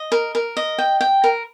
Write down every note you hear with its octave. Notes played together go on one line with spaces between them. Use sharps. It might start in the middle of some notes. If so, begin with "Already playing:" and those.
Already playing: D#5
A#4
A#4
D#5
G5
G5
A#4